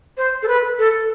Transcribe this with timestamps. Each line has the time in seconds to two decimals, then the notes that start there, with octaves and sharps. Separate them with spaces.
0.17 C5
0.42 A4
0.48 B4
0.79 A4